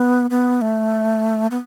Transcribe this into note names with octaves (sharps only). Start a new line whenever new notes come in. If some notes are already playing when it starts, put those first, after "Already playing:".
Already playing: B3
B3
A3
B3